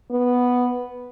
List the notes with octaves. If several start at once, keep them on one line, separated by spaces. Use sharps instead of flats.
B3